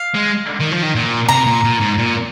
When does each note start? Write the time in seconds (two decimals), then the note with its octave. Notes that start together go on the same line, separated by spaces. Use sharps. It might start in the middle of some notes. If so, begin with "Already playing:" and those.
Already playing: F5
0.14 G#3
0.60 D#3
0.71 F3
0.83 D#3
0.95 A#2
1.29 C3 A#5
1.46 A#2
1.64 A#2
1.80 G#2
1.98 A#2